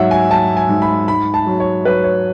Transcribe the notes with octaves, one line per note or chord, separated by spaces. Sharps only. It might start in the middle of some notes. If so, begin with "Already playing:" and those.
Already playing: G#2 F#3 E5 F#5
G#5
F#3 A5
G#5
G#2
B5
G#2 B5
A5
F#3
C#5
F#3 B4
C#5